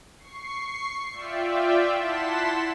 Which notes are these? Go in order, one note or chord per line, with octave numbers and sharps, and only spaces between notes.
C#6 C7
F4 D5 E5 G5
E4 F#5 A5 C6 B6 E7